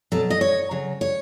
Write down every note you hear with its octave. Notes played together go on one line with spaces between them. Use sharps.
B2 F#3 A4
D#5
C#5
C#3 F#3
C#5